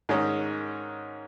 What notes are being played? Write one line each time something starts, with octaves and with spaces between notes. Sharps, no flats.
G#2 D#3 G#3 C#4